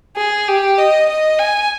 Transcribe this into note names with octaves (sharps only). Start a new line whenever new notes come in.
G#4
G4
D#5
D#5
G#5